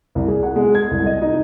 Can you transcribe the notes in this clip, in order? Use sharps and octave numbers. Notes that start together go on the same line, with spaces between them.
C2
G#4
F#5
G#3
G#6
C2
D#5
D#4